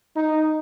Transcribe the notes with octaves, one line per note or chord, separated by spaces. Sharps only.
D#4